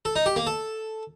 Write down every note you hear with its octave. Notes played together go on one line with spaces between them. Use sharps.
A4
D#4
G4
A#3
A4